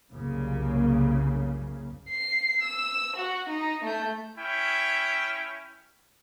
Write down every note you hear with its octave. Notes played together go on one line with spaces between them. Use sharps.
C2 F#2 C#3 A#3
C7
E6
F#4
D#4
A3 G6
C#4 E4 G5